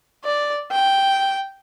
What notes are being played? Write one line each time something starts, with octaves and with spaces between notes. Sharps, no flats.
D5
G5